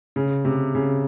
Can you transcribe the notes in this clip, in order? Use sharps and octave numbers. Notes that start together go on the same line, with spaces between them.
C#3
C3
C#3